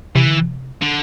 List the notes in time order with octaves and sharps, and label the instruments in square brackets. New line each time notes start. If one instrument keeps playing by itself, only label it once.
[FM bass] C3 [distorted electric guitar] E3
[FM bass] D3
C3
[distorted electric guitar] D3